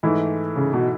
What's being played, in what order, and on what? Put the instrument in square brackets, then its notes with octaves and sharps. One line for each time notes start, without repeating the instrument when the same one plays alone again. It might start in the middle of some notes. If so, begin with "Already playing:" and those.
[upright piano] G#2 E3 A3 E4
[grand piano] C#3
B2